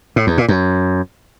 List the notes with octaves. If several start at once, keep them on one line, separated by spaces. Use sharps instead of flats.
A2
E2
A#2
F#2